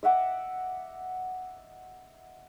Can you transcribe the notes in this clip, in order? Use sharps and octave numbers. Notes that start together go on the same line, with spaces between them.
D#5 E5 F#5 D6